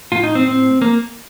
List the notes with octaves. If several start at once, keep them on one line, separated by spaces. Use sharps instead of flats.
A2 F4
D#4
C4
C4
A#3